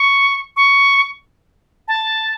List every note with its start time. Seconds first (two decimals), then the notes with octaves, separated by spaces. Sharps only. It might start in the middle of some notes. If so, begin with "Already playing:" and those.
Already playing: C#6
0.56 C#6
1.88 A5